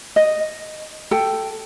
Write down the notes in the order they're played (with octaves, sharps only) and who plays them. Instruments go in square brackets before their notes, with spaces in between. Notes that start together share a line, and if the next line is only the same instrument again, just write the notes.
[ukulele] D#5
A4 G5